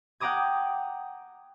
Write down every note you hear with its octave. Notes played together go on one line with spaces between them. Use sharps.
F#5 G5 A#5 D6 D#6 G#6